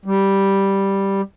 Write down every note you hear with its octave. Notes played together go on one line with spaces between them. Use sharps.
G3